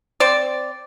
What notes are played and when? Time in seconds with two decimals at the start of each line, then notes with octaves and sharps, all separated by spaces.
0.20 C4 C5 D5